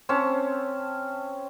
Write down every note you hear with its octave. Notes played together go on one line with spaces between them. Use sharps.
C4 C#4 A5